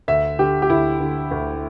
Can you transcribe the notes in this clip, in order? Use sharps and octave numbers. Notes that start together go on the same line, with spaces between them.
D2 E5
D3 G4
G4
D2 E4
D3
D2